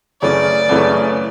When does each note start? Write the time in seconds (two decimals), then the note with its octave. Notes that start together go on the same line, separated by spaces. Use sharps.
0.22 F#2 C#3 E3 A3 C#4 D5
0.69 F#2 C#3 E3 A3 C#4